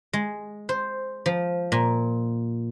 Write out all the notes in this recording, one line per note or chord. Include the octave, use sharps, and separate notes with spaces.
G#3
C5
F3
A#2